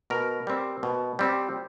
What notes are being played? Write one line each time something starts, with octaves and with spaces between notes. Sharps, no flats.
B2 A#4
G3 C4
B2
G3 C4